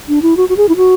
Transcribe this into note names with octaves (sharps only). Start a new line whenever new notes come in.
D4
E4
F#4
F#4
G#4
E4
F#4